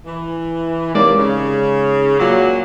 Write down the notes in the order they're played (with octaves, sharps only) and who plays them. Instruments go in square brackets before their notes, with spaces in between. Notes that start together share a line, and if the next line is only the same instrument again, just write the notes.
[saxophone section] E3
[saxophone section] C3 A#3 D5 [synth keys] G#3 D#4 C#5
[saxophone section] C#3
[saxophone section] A#2 F#3 [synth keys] F5 D6